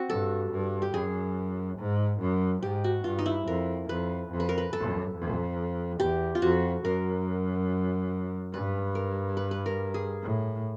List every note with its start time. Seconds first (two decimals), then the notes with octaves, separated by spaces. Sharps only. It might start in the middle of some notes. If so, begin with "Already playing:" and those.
Already playing: C4 F#4
0.09 G2 A4
0.52 G2
0.82 G4
0.93 F#2 G#4
1.79 G#2
2.20 F#2
2.63 G#2 G4
2.84 F#4
3.04 G2 F4
3.19 D#4
3.26 E4
3.47 F2 A#4
3.89 F2 B4
4.31 F2
4.40 B4
4.49 A#4
4.58 B4
4.73 F#2 A4
5.15 F2
6.00 E2 G4
6.35 F4
6.42 F2 F#4
6.85 F#2 A#4
8.53 G2 B4
8.95 A#4
9.37 B4
9.51 B4
9.66 A#4
9.94 G#4
10.22 A2